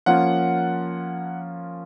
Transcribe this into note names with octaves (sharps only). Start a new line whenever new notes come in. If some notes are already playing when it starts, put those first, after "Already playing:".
F3 A#3 C#4 F4 F#5